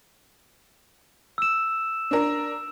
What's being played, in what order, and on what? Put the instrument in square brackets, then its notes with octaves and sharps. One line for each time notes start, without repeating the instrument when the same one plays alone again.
[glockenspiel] E6 E7
[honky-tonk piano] D4 A#4